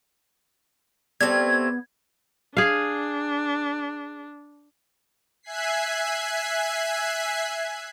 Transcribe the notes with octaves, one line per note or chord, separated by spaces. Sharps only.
G3 A3 B3 C4 G#6
D4 G#4 F5
E5 G#5 F#6 G#6 B6 C7